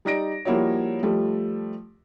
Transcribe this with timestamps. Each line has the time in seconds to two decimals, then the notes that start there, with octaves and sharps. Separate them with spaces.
0.05 G3 D#4 D5 A#6 D7
0.45 F3 G3 A#3 E4 F#4 C#5
1.03 F3 G3 A3